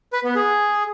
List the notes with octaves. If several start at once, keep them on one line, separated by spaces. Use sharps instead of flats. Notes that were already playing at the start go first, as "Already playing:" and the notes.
B4
B3
G#4